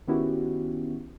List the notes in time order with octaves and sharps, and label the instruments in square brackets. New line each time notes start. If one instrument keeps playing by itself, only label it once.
[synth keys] D#3 B3 C#4 E4 F#4 G4